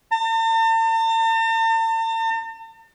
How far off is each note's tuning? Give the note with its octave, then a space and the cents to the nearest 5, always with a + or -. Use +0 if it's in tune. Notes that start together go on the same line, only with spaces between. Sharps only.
A5 +45